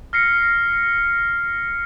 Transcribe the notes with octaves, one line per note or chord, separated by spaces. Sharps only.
F6 A#6 C7 C#7